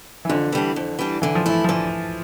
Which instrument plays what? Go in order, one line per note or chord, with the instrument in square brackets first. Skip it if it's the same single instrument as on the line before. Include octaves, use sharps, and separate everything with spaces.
[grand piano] E3
[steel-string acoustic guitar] F2 [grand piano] D3
[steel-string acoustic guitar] E3 G3 D4
F2
E3 G3 D4
[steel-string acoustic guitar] D3 [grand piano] E3
[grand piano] F3
[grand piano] E3 [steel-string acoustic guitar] A3 E4
[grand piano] F3
[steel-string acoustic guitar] D3 [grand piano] E3